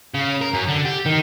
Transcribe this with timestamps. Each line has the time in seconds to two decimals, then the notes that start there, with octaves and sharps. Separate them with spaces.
0.14 C#3
0.41 A#4
0.54 F#2
0.68 D3
0.85 G4
1.06 D#3